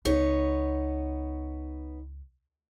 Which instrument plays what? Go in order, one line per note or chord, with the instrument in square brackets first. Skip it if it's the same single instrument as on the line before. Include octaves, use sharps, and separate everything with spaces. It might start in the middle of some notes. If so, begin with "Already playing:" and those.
[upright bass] C#2 [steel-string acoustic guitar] B3 D#4 C#5